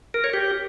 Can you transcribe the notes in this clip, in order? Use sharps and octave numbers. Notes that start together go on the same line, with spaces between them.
A#4
C#5
G4